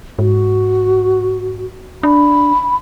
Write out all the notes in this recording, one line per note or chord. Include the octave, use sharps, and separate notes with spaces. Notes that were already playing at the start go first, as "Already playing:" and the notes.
G#2 F#4
D4 B5